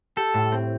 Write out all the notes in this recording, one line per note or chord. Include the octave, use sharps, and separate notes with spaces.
G4 A4
A2
C4